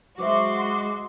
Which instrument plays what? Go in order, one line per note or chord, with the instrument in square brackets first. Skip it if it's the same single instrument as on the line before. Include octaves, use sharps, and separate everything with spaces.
[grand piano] F#3 C5 E5 [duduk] G#3 [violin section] F#4 C6 [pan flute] D6